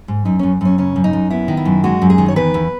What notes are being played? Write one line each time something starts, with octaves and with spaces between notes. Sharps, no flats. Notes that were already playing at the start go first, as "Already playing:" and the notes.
G#2
F#2 D#4
F#2 C#4
F#2 C#4
C#3 C#4
F#2
D#4
F#2
B3 E4
D#3
E4
F#2
G#3 F#4
F#2
G#4
D#3
C#5
E2 B4
E2